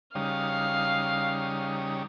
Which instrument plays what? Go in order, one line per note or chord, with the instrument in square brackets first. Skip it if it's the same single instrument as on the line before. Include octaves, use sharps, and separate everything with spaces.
[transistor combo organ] C#3 G3 D#4 [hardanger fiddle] F5